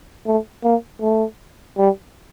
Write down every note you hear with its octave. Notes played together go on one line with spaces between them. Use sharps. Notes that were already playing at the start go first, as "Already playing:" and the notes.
A3
A#3
A3
G3